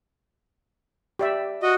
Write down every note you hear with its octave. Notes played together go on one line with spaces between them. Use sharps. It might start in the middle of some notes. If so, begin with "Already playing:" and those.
G4 D5 E5
F#4 D#5